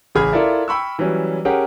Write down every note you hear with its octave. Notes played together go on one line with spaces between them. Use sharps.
A1 C#3 G#4 B5 F6 G#6
E4 F4 A4 A#4 D5 E5
G5 B5 C#6 E6
E3 F#3 G3 C#4
C#4 G4 G#4 A#4 F#5